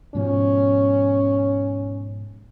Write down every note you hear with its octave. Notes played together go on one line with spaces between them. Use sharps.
G#2 B2 F3 C#4